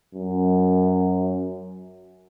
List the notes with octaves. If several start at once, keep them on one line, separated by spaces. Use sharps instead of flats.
F#2